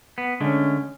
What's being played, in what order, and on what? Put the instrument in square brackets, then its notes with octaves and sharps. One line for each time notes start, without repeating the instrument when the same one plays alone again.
[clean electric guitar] B3
[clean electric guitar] D3 G#3 A3 [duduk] C#4